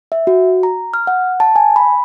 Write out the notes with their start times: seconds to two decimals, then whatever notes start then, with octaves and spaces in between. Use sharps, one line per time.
0.12 E5
0.27 F#4
0.63 A#5
0.94 F6
1.07 F#5
1.40 A5
1.56 G#5
1.76 B5